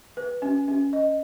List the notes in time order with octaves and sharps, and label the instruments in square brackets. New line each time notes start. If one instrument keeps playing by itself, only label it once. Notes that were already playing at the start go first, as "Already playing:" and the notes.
[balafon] B4
C#4
C#4
D#5